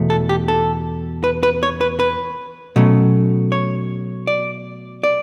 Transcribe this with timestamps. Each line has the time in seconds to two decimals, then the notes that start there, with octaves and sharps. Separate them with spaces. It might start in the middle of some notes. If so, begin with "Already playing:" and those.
Already playing: E2 B2 A3
0.10 A4
0.29 G4
0.48 A4
1.24 B4
1.43 B4
1.63 C#5
1.81 B4
2.00 B4
2.76 B2 F#3 A3 C#4
3.52 C#5
4.27 D5
5.03 D5